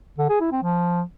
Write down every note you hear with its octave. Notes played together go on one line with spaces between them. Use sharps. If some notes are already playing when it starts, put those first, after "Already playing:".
D3
G#4
E4
C4
F3